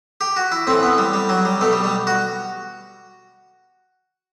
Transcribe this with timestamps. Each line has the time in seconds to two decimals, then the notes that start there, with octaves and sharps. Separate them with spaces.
0.21 G4
0.36 F#4
0.52 E4
0.67 A2 E3 C4
0.83 B3
0.98 G3
1.13 G3
1.29 F#3
1.45 G3
1.61 B2 A3
1.73 G3
1.84 G3
2.07 F#4